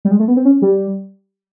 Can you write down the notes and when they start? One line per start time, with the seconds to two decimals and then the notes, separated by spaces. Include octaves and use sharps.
0.05 G3
0.11 G#3
0.19 A3
0.28 B3
0.37 C4
0.45 C#4
0.62 G3